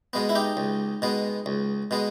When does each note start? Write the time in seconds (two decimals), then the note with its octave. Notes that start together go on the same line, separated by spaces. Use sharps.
0.13 B2 G#3 B3
0.29 E4
0.35 D#4 G4
0.57 C#2
1.02 B2 G#3 B3
1.46 C#2
1.91 B2 G#3 B3